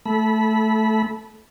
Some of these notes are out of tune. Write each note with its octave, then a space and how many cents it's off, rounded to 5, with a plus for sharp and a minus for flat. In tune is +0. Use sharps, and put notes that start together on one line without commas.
A3 +0 A4 -25 B5 -15